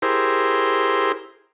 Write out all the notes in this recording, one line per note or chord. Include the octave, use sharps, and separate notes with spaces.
E4 G4 G#4 A#4 C5